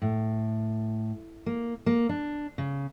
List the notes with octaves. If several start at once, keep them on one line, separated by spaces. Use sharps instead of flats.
A2
A#3
A#3
D4
C#3